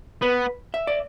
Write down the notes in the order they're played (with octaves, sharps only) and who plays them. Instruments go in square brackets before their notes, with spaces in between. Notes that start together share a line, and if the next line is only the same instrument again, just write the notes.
[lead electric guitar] B3 [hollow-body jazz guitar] B4
[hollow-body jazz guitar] E5
D5